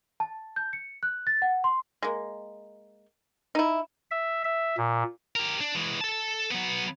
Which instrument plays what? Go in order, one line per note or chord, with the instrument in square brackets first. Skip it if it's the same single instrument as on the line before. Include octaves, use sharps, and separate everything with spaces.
[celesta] A5
G6
C#7
F#6
A6
F#5
C6
[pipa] G#3 A#3
D#4 E4
[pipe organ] E5
E5
A#2
[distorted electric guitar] G4 A#4
D4
E3 G#3
A4 A5
F#3 B3